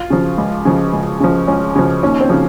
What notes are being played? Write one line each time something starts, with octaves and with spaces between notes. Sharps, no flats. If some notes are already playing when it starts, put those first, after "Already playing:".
Already playing: F4
C#3 F3
C#2
C#3 F3
C#2
C#3 F3
C#2 C#4
C#3 F3
D#2 C#4
C4
C#3 F3